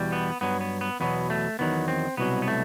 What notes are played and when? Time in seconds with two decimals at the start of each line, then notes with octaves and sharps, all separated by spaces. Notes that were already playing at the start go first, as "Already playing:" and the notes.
Already playing: E2 B2 G3
0.12 B3
0.41 G2 F#3 B3
0.61 B3
0.81 B3
1.00 E2 B2 F#3 B3
1.30 A3
1.59 E2 D#3 F#3 B3
1.88 C4
2.17 C2 B2 F#3 B3
2.42 B3
2.48 A3